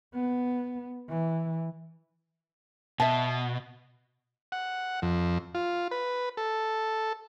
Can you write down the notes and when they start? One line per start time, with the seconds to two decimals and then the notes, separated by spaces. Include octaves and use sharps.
0.14 B3
1.09 E3
3.00 B2 E5 A5
4.52 F#5
5.02 F2
5.55 F4
5.91 B4
6.37 A4